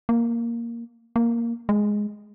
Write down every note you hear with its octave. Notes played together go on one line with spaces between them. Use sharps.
A#3
A#3
G#3